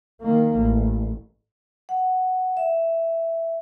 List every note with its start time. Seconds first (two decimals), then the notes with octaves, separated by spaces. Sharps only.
0.21 D#3 A#3
0.58 A1
1.89 F#5
2.57 E5